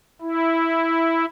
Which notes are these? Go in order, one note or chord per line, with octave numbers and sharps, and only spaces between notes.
E4